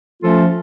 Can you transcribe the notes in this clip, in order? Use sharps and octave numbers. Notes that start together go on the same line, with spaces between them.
F3 A3 C#4 F4 A4